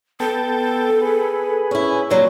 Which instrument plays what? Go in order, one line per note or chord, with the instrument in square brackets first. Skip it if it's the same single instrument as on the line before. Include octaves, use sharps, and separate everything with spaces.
[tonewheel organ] B3 G5 A5 [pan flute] A4
[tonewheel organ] G#4 B4
[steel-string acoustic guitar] C#4 E4
[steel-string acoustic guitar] C3 F#3 [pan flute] A#3